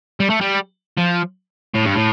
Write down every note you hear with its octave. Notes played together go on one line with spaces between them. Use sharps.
G3
A3
G3
F3
A2
G2
A2